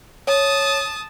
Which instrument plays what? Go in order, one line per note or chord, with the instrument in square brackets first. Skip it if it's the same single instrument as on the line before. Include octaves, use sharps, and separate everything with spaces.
[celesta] C#5 [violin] A5 D#6